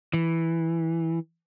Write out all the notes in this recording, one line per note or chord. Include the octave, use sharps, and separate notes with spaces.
E3